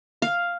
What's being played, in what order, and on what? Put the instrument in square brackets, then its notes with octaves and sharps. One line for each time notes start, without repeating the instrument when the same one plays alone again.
[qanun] F5